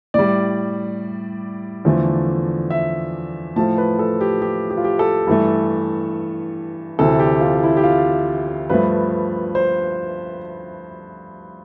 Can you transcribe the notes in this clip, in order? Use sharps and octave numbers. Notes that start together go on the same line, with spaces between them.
A2 G3 D5
E2 D3 F3 A3
E5
A2 F3 A3 A5
B4
A4
G4
G4
G4
F4
G4
A4
G2 E3 A3
D2 C3 E3 A4
G4
F4
E4
G4
F4
G2 F3 A3 B4
C5